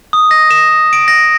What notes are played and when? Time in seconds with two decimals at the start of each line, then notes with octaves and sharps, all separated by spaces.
0.13 D#6
0.31 A#6
0.50 E7
0.93 D7
1.08 A#6